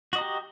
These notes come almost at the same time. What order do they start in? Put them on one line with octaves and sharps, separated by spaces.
F#4 D#5 A#5 G4